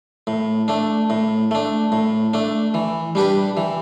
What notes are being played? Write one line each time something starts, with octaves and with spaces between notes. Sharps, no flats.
A2
A3 D4
A2
A3 D4
A2
A3 D4
E3
G3 D4 G4 B4
E3